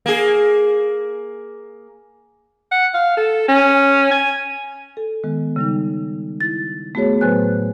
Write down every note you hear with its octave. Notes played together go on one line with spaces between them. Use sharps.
A#3 G#4
F#5
F5
A4
C#4
G#5
A4
D#3 G#3 B3
C#3 G3 D#4
E4 A6
A3 B3 F#4 G#4 C#5
A2 F#3 B4 C5 G#5 F#6